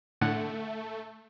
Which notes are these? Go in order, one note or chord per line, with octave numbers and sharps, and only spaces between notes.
A2 D3 A3 F#5